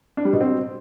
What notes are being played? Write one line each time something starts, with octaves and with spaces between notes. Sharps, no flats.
D4
G3
B2
C4